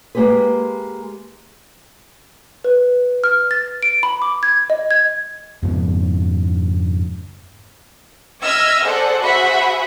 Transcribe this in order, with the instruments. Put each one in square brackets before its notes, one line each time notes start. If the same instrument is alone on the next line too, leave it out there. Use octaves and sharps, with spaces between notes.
[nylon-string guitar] G#3 A#3 D#4 G4 G#4 B4
[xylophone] B4
F6
A6
D7
B5
D6
G#6
D#5
G#6
[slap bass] F2 G#2 C#3 B3
[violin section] D#5 E5 E6 F6 G#6 A#6
G#4 A4 C5 D5 F#5
F#4 G#4 C5 E5 F#5 B5